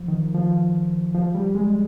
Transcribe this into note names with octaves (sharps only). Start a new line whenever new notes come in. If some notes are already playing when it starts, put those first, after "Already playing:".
Already playing: F3
D#3
F3
F3
G3
G#3